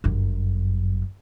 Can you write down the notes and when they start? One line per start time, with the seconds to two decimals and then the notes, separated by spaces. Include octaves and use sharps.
0.04 G1 F#2